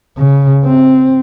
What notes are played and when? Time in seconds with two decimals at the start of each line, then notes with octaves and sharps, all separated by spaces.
0.18 C#3
0.65 C4